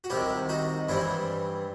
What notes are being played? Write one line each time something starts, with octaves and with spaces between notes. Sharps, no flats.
F#4
C2 C3 D#3 E4 G4
D#4 F#4
G2 E3 G3 C4 E4